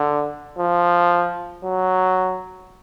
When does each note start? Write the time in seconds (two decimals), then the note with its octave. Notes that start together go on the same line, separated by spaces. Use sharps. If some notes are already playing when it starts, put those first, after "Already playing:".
Already playing: D3
0.58 F3
1.64 F#3